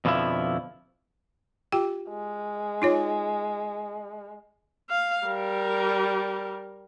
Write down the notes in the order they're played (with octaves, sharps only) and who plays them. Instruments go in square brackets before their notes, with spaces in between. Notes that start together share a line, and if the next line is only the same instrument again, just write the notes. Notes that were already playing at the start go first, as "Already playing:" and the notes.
[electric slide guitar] F2 B2 D3 F3 E4
[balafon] F4 G4 G5
[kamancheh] G#3
[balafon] D#4 F4 C#5
[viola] F5
G3 A#4